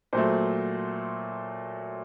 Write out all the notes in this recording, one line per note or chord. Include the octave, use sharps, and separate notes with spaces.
A#2 F#3 A3 C5